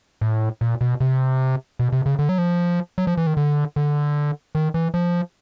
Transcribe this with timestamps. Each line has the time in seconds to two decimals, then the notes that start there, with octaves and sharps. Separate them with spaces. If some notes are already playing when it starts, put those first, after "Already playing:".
0.21 A2
0.61 A#2
0.81 B2
1.00 C3
1.79 B2
1.92 C3
2.06 C#3
2.19 D3
2.29 F#3
2.38 F3
2.98 F#3
3.07 F3
3.17 E3
3.27 D#3
3.37 D3
3.76 D3
4.55 D#3
4.74 E3
4.94 F3